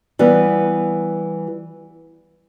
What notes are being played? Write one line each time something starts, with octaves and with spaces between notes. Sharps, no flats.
E3 G3 B3